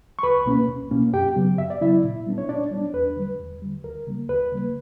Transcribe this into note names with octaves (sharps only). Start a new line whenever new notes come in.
C#6
C#2 B4 B5
B2 A#3 C#4
C#2
B2 A#3 C#4
F#2 G4 G5
C#3 F#3 B3
F#2 E5
D5
C#3 F#3 B3 E4 E5
A#2
G3 B3 D4
C#5
A#2 D4 D5
G3 B3 D4
E2 B4
D3 G3
E2
D3 G3
D2 A#4
C#3 G3 A#3
D2 B4
C#3 G3 A#3